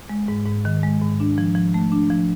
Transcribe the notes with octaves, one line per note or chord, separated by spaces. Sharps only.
G#3
G#2
G#2
D#3
G#3
G#2
D4
F3
F3
A3
D4
F3